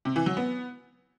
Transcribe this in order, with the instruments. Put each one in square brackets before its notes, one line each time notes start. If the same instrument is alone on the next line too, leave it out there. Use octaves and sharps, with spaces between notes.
[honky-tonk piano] C3
E3
F#3
B3